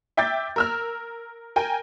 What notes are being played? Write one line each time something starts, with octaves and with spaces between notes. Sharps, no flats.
E5 G5 D6 G6 A6
A#4 E6 F6
A#4 G5 G#5